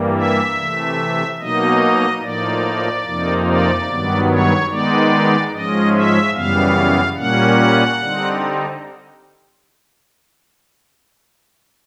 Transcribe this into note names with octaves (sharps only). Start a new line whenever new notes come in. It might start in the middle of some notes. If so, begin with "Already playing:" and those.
Already playing: G2 E3 G3 A#3
E5
C3 E3 A3
B2 F#3 A#3 D#4 D#5
A2 F3 A#3 D#4 D5
F2 C3 F3 A#3 D#4
D5
G2 D#3 F#3 B3
C#5
D#3 G#3 B3 D#4 D5
G#2 F3 G#3 C#4 D#5
E5
F#2 C#3 E3 G3 B3 F5
A#2 G3 A#3 C#4 F#5
D3 G3 C4 D#4